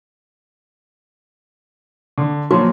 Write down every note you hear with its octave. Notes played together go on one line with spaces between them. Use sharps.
D3
A#2 F3 F#3 F#4